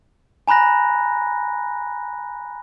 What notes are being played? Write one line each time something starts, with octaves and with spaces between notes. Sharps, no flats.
G#5 A#5 B5 F#6 A#6